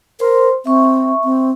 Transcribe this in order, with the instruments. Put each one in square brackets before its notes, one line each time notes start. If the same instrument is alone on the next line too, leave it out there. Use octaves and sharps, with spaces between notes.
[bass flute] A#4 [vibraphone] C5 C6
[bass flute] C4 [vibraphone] E5 C#6
[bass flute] C4